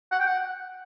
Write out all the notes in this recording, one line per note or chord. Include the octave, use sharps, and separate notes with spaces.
F#5
G5
F#5